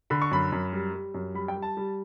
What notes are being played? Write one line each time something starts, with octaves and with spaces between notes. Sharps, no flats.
D3 B5
C#6
F#2 B5
F#2
G3
G3
F#2
G3 B5
G5
G3
A5
G3